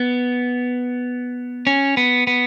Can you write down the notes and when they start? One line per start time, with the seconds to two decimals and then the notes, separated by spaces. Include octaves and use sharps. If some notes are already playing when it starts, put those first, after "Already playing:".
Already playing: B3
1.67 C#4
1.97 B3
2.27 B3